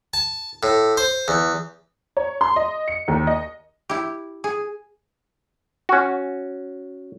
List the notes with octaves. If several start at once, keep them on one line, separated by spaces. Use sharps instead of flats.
A5
A2
C5
E2
C#5
C6
D#5
C#7
D#2
D#5
E4 G4
G#4
C#4 F#4